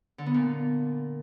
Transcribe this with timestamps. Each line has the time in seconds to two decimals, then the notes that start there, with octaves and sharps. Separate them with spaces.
0.18 D3
0.26 B3
0.34 A#2